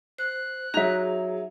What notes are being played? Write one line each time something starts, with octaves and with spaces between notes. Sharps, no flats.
C5 F#6
F#3 D#4 G#4 E5 F7